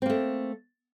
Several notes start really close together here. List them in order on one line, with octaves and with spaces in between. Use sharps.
C4 A#3 A3